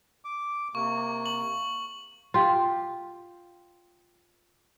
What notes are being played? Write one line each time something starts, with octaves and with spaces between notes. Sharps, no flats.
D6
C3 A#3 C#6
F#7
F4 G4